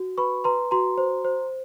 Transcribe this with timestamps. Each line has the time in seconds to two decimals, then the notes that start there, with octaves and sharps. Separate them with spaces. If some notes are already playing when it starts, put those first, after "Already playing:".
Already playing: F#4
0.18 B4 B5 C#6
0.44 B4 A#5 C6
0.71 F#4 A#5 C6
0.98 C5
1.25 C5